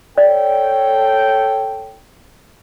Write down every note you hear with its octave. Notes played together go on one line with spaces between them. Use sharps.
A4 C#5 D5 G5